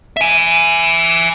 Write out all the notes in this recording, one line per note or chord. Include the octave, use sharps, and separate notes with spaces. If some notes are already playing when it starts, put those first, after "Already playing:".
E5 G#5